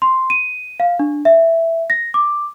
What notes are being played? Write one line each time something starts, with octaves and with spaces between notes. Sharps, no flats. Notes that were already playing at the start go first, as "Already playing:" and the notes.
C6
D#7
F5
D4
E5
A#6
D6